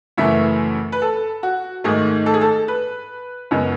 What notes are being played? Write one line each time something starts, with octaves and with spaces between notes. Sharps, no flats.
F#2 C#3 E3 A3 E5
B4
A4
F#4
G#2 D#3 A3 G#4
A4
G#4
A4
B4
F#2 C#3 G#3 B3